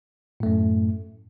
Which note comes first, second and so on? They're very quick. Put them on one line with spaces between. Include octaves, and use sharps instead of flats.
A2 A3 F#2